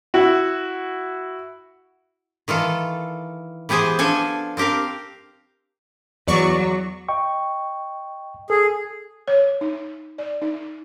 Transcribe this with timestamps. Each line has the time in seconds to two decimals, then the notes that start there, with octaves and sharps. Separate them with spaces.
0.14 E4 F#4
2.48 D#3 E3 F4 A4
3.69 E3 B3 G4 G#4 C5
3.99 F3 D4 A4 G#5
4.57 C4 D4 G4 A#4 F5
6.28 E2 F#3 D5 C#6
7.08 D#5 G5 C#6
8.50 G#4 A4
9.28 C#5
9.61 D#4
10.18 D5
10.42 D#4